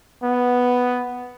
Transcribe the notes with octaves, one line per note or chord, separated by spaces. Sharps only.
B3